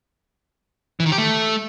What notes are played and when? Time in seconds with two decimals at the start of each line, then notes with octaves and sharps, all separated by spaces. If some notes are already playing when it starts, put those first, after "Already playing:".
1.00 E3
1.06 D#3
1.12 G4
1.18 A3